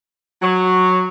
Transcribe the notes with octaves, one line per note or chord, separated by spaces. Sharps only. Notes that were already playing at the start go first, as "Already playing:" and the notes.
F#3